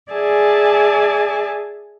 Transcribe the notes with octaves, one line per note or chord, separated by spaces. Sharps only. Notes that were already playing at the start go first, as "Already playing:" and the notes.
G#4 D5 E5 G#5 A5